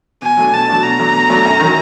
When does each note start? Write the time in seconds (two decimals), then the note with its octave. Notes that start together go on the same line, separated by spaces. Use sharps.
0.22 B2 G#5
0.37 F#3 A3 D4
0.52 B2 A5
0.68 F#3 A3 D4
0.83 B2 A#5
0.99 F#3 A3 D4
1.13 B2
1.30 F#3 A3 D4
1.45 F#2
1.60 D#3 F#3